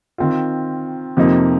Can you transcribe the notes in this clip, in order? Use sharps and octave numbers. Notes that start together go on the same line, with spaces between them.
D#3 C4 F4
F2 C3 F3 A#3 D#4